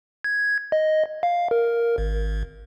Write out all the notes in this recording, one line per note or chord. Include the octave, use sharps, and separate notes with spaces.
G#6
D#5
F5
A#4
G#1